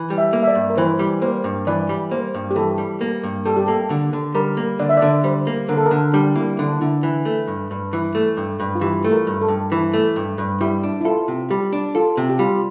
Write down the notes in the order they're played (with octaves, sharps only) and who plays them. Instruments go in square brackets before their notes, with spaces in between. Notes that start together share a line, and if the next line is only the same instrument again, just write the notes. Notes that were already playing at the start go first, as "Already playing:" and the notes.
Already playing: [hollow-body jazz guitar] E3
G3
[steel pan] E5
[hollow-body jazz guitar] A#3
[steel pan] E5
D5
[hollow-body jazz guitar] G2
[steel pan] A#4
[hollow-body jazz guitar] E3 [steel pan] C5
[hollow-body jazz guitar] G3
[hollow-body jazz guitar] A#3 [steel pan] C5
[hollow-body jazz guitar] G2
[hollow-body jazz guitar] E3 [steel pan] D5
[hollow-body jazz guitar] G3
[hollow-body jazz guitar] A#3 [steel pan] C5
[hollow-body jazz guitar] G2
[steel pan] G4
[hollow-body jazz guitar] E3 [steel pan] A4
[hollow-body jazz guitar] G3
A#3
G2
[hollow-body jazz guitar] G3 [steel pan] A4
[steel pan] G4
[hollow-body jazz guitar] A#3 [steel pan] A4
[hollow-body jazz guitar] D3
D3
[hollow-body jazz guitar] G3 [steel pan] A#4
[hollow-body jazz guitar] A#3
[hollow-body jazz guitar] D3 [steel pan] D5
[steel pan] E5
[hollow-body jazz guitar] D3 [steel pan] D5
[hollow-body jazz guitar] G3 [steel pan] C5
[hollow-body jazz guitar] A#3
[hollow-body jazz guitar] D3 [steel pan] A#4
[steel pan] A4
A#4
[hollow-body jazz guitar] D3
[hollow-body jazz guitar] G3 [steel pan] D4
[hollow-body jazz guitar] A#3 [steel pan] E4
[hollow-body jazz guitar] D3 [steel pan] D4
[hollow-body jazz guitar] D3 [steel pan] E4
[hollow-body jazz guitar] E3
A3
G2
G2
E3
A3
G2
G2
[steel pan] F4
[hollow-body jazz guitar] E3 [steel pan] G4
[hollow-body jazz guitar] A3
[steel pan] A#4
[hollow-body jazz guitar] G2
[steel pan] A4
[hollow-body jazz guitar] G2
E3
A3
G2
G2
[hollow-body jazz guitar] G3 [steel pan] E4
[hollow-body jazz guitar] D4
[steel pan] E4
[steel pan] F4 [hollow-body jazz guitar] A4
[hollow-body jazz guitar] C3
[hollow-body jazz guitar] G3 [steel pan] G4
[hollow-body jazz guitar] D4
[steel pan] F4 [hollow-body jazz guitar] A4
[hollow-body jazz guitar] C3
[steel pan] G4
[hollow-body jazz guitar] G3 [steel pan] F4